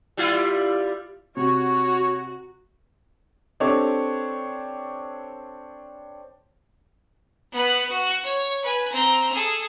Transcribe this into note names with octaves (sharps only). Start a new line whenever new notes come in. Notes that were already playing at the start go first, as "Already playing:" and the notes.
G3 E4 F4
C3 F#4 C#5
C4 D4 G4 A4 C#5
B3 B4
F#4
C#5
B4 G#5
C4 A#5
G#4 A4